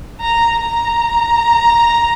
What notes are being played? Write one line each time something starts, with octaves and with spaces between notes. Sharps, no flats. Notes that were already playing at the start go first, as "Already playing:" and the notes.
A#5
A#5